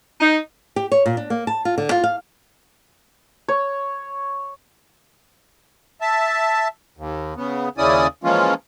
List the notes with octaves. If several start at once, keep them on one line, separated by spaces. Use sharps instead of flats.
D#4
G4
C#5
A#2
D4
A#3
A5
F4
D3
F4
F5
C#5
E5 A5
D#2
C#3 B3
D#2 C#3 C#4 E4 D5 D#6
E3 F3 G#3 A#3 C#4 F4